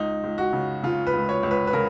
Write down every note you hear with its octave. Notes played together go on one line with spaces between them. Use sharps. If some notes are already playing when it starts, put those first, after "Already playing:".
Already playing: C#2 D#4
C#2
F#4
C#3
C#3 F4
B4
C#2
C#5
C#2
B4
B4
C#3 A#4